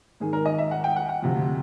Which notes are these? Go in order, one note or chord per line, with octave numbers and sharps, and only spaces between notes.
G#2 D#3 G#4
A#4
D#5
E5
F#5
G5
F#5
F#5
D2 C3 F3